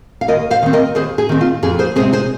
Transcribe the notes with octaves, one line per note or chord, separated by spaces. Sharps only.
F5
D#2 A#4 D#5
C5 F5
D#3 C4
A#4 D#5
D#2 G#4 C5
G#4
D#3 C4
F4
F2 G#4
G#4 C5
C3 G#3 C4 G#4 C5
G#4 C5